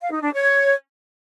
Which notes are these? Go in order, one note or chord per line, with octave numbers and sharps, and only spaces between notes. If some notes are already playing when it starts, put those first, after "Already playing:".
F5
D#4
D4
C#5